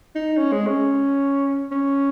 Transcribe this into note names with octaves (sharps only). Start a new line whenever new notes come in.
D#4
C#4
G#3
C#4
C#4